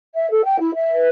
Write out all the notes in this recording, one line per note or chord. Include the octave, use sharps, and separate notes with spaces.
E5
A4
G5
E4
E5
B4